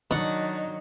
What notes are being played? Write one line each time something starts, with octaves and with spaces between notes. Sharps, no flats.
B2 D#3 F#3 D4 D#4 F#5